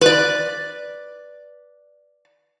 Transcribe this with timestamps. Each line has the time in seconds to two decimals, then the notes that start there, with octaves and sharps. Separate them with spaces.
0.01 B4 D5